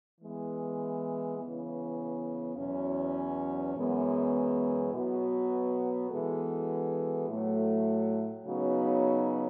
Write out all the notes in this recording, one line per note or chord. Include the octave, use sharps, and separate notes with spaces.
E3 G#3 B3
C#3 E3 B3
E2 B2 F#3 C#4
F#2 E3 G#3 B3
B2 F#3 B3 F#4
E3 G#3 B3 F#4 A4
A2 F#3 A3
C#3 F#3 B3 D#4 F#4